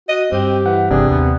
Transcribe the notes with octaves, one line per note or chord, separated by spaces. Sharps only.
F#4 D#5
G2 C4 G4
E3 F#5
G1 G2 C3 E3 D4 G#4
D#2 B3 C4